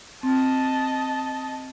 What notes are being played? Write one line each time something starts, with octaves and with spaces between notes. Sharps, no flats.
C4 D#5 A5